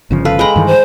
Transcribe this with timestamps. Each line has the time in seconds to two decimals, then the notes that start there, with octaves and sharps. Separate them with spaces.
0.11 G1 C#3 F3
0.25 A4 B4 F5
0.39 G#3 G5 A#5 B5
0.56 G2 D#3 E3
0.67 C5